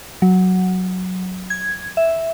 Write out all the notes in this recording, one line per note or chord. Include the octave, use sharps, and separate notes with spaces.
F#3
G#6
E5